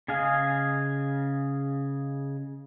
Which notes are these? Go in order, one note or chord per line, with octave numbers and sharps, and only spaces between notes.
C#3 G#4 D#5 F5 G#5